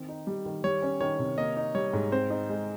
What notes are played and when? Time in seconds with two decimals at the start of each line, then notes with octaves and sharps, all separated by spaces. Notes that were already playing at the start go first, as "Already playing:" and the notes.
Already playing: D#3 C4
0.09 D#4
0.27 G3
0.45 D#3
0.64 G3 C#5
0.82 C#4
1.01 D#3 C#5
1.19 C3
1.37 A#3 D#5
1.56 D#4
1.75 G3 C#5
1.93 G#2
2.12 C4 C5
2.30 D#4
2.49 G#3